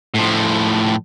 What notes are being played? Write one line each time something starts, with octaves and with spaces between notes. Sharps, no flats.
A2 F3